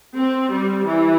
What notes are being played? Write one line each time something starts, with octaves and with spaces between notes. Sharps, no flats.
C4
G3
E3